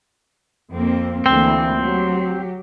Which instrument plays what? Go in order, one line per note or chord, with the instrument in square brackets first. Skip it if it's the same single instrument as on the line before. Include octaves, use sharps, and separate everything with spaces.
[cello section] F2 A#3 C4
[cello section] D2 E3 A#3 [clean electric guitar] C4
[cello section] F#3 G4